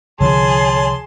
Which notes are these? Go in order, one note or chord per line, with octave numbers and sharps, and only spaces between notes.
C2 D3 F3 G#4 C#5 A5 C6